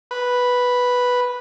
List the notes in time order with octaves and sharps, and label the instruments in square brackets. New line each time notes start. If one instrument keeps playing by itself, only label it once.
[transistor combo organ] B4